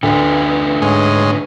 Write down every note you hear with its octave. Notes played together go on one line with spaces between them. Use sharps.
D2 D3 A3 B4
G#2 G#3 C#4